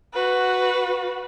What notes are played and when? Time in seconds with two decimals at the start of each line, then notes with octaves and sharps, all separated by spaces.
0.14 F#4 B4